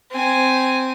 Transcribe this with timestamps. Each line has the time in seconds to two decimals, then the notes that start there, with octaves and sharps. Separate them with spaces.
0.11 C4 G#5